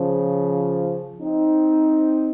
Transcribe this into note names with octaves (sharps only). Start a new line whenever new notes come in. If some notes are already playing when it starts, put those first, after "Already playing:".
Already playing: C#3 F3
C4 D#4